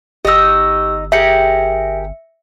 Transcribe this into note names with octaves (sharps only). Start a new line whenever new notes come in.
G1 D#4 G4 D#5 E6
G4 G#4 A#4 E5 C#7